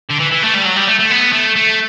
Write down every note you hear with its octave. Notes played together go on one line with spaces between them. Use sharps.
D3
E3
E3
A3
G3
F#3
G3
A3
A3
B3
A3
A3